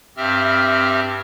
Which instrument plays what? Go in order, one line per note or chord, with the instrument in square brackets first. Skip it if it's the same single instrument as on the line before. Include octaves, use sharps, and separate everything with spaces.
[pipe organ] G2 C4 G4 E5 F6